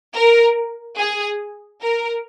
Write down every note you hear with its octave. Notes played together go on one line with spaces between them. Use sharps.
A#4
G#4
A#4